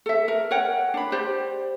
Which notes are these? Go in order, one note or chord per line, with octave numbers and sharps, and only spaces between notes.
A4 E5
A#4
A#4 C#5 F#5 G5
D4 B5
G4 C5 D5